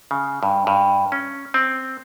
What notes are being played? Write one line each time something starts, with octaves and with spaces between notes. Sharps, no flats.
C#3
G2
G2
C#4
C4